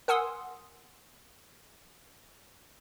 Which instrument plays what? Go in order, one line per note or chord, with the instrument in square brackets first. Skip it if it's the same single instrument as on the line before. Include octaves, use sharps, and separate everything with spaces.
[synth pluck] A#4 F#5 G#5 C6 D#6 E6